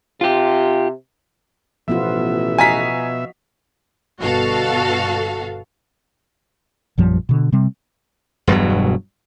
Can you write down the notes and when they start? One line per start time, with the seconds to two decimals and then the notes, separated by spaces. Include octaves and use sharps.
0.21 C3 F4 G4
1.88 A1 B2 F3 B3 F4 E5
2.58 F#4 D#5 F5 G#5 A#5 B6
4.21 G1 B2 F#4 A4 F5
6.98 A#1 F#2 F3 G3
7.29 B2 D3
7.52 C3 G3 C4
8.47 E1 G2 B2 F#3